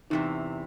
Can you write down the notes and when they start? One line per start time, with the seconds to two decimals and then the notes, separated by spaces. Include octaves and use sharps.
0.10 E2 C3 E3 D#4